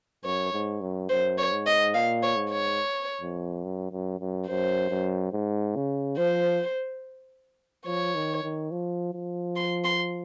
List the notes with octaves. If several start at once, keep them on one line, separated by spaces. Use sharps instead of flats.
F#2 C#5
G#2
F#2
F#2 C5
C#5
G#2
D#5
A#2 F5
C#5
G#2
C#5
F2
F#2
F#2
F#2
F#2 C5
F#2
G#2
C#3
F3 C5
F3 C#5
D#3
D#3
F3
F3
C6
C6